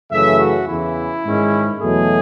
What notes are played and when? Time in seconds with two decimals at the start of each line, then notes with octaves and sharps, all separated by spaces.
0.11 F#2 C#3 E3 A3 C#4 E5
0.39 F#4
0.67 E2 C#3 E3 E4
1.25 G#2 D#3 G#3 C#4
1.80 E2 B2 F#3 A3 G#4